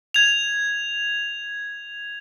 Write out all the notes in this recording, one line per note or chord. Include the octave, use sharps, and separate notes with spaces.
G#6 F7